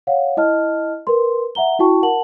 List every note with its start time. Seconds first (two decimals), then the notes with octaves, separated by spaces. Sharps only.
0.07 C#5 F5 F#5
0.37 E4 D#5 A5 F6
1.07 A#4 B4 C6
1.55 E5 F#5 A#5 G7
1.79 E4 F#4 G5 A5 C#6
2.02 A#4 F#5 A5 F#7